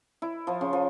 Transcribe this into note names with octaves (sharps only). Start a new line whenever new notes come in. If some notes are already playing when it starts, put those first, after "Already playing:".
E4
F3
C#3
F3